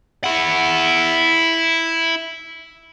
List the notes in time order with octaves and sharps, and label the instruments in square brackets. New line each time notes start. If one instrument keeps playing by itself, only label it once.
[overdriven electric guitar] E4 F#5